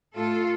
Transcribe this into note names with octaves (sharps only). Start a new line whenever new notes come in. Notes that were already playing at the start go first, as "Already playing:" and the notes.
A2 A3 F4 A4